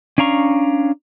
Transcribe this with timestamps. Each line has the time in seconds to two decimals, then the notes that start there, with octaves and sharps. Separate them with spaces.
0.18 C#4 D4 F5 A#5 C#6